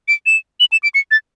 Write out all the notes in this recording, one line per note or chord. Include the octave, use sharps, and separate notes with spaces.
D7
E7
F#7
E7
D7
C#7
A6